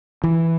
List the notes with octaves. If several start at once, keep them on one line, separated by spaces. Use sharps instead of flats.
E3